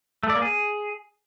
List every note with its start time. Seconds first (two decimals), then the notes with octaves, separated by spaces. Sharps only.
0.23 A3
0.30 D5
0.36 A#3
0.42 G#4